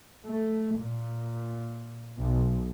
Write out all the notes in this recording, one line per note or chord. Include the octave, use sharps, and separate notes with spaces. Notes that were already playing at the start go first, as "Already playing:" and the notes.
A3
A#2
B1